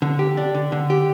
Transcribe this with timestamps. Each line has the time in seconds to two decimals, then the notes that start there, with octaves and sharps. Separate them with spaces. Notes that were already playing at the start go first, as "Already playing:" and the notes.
0.02 D3
0.19 G4
0.37 D4
0.55 D3
0.72 D3
0.90 G4